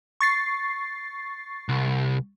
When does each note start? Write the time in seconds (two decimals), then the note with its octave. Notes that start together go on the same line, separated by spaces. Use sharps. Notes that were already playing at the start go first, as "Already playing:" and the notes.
0.21 C#6 A6 C7
1.69 C2